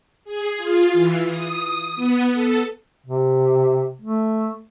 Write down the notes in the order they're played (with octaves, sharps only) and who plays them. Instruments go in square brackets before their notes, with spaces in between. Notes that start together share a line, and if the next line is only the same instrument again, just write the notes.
[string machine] G#4
F4
E3
D#6
B3
A4
[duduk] C3
A3